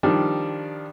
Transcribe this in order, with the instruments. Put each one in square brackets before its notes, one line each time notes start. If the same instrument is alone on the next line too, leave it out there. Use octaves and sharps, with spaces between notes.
[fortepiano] D#3 F3 G3 D4